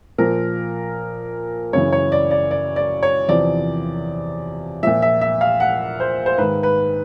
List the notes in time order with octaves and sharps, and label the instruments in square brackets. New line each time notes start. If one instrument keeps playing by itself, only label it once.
[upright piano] A#2 F3 A#4
F#2 C#3 E3 C#5
C#5
D5
D5
D5
D5
C#5
E2 C3 F3 D5
A#2 F3 E5
E5
E5
F5
F#5
C5
C5
G#2 D#3 B4
B4